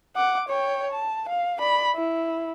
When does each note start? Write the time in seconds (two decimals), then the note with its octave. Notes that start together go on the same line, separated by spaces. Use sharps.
0.16 F#5 D6
0.49 C#5 G5
0.92 A5
1.29 F5
1.59 D5 B5
1.95 E4